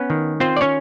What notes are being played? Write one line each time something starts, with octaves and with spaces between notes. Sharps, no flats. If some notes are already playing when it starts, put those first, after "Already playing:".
Already playing: B3 C#4 B4
D#3
C4 F4 C5
D5
C#4 C#5